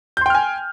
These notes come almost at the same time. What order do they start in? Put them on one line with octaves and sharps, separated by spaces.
G6 C6 G5 F6 G#5